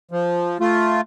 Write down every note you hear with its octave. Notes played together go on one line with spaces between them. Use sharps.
F3
A3 F4